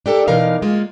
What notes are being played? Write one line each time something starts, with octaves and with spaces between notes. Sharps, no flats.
D4 G4 A4 A#4
B2 E3 D#4 A#4 F5
G#3 A#3 F4